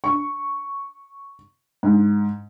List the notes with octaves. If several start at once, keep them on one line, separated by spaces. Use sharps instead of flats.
C#6
G#2